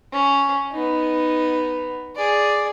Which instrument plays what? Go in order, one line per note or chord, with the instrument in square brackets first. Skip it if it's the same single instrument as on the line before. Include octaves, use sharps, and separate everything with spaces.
[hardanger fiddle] C#4
B3 D#4
G#4 D5